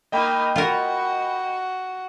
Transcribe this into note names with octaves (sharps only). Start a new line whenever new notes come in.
A#3 D#4 D#5 G5 B5
F4 F#4 A#4